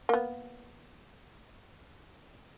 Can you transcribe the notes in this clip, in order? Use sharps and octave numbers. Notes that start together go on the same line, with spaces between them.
A#3 B3